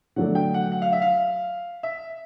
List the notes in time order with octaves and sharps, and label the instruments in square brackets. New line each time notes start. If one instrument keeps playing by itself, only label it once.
[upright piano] D3 F#3 A3 D4 [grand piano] F#5
[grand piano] G5
F#5
F#5
F5
E5
F5
E5